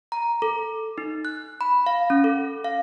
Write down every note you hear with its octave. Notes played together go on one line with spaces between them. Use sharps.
A#5
A4
D#4
F#6
B5
F5
C#4
A4
F5